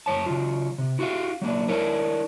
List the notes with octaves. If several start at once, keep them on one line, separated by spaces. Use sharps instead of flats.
F#2 C#5 A5
C#3 F#3 F4
C3
E4 F#4 G4 D5 F5
F#3 A#3 D4
D4 E4 A#4 C#5